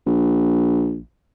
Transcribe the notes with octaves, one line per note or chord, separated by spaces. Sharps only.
A#1